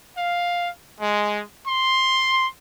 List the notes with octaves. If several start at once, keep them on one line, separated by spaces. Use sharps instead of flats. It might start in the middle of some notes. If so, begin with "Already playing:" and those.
F5
G#3
C6